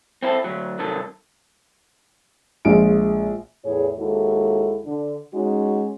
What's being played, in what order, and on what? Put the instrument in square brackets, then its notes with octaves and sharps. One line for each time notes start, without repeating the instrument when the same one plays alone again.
[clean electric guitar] C4 E4 F4 A4
D2 F#3
C2 G2 D#3 F#3 A4
[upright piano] A#1 G#3 F4 D7
[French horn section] E2 A2 E4 G#4 C#5
D#2 G#3 E4 F#4 A4
D3
G#3 C#4 D#4 F#4